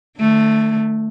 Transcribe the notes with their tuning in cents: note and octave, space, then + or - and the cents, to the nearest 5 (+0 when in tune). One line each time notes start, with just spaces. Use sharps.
D3 +35 A3 +0